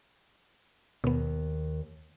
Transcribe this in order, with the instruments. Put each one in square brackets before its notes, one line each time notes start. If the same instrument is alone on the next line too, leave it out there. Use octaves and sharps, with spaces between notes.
[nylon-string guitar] D#2 [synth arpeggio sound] B2 B3